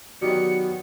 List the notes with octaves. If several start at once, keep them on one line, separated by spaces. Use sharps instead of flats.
D#3 F#3 B3 G4 D5 C#7